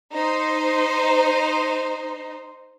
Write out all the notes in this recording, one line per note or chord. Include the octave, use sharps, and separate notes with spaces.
D#4 C5